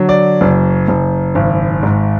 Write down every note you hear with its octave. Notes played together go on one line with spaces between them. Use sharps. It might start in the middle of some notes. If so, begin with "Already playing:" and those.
Already playing: D3 F#3
D5
F#1
F#1
G#1
G#2